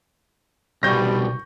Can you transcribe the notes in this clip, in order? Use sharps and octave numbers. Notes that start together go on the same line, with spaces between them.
C2 B2 G3 C#6 G6 A#6